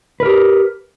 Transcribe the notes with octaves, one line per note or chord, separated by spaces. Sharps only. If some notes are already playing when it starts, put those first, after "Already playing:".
G4 A#4 B4